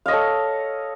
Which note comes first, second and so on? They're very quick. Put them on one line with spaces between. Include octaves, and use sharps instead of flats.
F5 D#5 C#5 A4